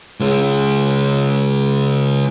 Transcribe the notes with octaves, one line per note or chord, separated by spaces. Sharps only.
C#3 G#3